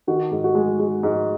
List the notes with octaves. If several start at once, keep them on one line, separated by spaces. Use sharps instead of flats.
D#3 F#4
G#2
F#4
G#3
G#3
G#2